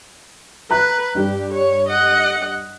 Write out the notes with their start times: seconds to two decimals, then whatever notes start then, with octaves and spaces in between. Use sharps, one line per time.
0.71 B4 A#5 F#6
1.15 G2 G3 G4
1.53 C#5
1.89 D#5 F#5